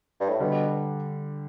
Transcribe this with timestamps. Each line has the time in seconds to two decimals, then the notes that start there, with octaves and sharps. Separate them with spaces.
0.21 G2
0.29 A2
0.40 B2 D3 G3 D4